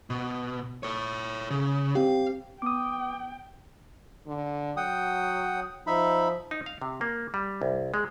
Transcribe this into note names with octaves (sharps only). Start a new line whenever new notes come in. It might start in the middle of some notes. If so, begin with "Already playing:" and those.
B2
A4 C#5
C#3
C4 G4 F5
B3 G5 D6 D#6
D3
F#3 F#5 G5 D#6
F3 D#4 E5 B5
D#4
F5
C3
A#3
G3
C2
G#3